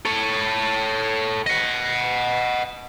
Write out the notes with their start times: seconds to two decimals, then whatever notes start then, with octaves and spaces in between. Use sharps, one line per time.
0.06 A4 C#5
1.47 D#5 F#5